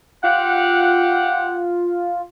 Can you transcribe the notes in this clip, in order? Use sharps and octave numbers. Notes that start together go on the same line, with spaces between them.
F4 G4 F5 F#5